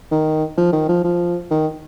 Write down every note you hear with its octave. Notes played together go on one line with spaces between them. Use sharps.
D#3
F3
D#3
F3
F3
D#3